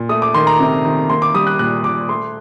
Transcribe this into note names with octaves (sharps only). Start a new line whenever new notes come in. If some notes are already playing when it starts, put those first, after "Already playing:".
Already playing: A#2
A3 D#6
D6
D#3 C6
A#5
C3
D#3
A#3 C6
D6
G3 D#6
F#6
A#2 F#6
A#2 D6
A3 C6